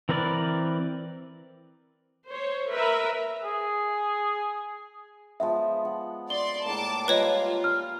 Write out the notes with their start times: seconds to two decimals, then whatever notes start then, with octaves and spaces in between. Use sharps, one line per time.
0.09 E3 C4 A#4 B4 D5
2.27 C5 C#5
2.70 A#4 B4 E5
3.44 G#4
5.40 F3 G#3 B3 E5
5.85 F#5
6.30 D5 C6 G7
6.66 A2 G#3 A#3 A5 D6
7.08 F3 G3 A#3 F4 B4 C#5 D#5
7.64 F6